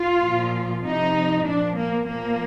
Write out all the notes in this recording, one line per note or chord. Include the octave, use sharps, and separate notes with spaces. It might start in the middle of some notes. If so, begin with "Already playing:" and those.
Already playing: F4
A#2 F3
C3 F3 D#4
A#2 F3 D4
A#3
A#2 F3 A#3